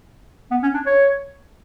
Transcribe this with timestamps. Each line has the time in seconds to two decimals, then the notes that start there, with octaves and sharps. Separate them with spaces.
0.51 B3
0.63 C#4
0.74 D4
0.86 C#5